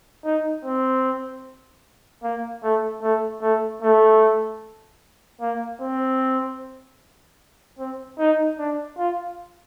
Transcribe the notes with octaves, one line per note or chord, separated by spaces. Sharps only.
D#4
C4
A#3
A3
A3
A3
A3
A#3
C4
C4
D#4
D4
F4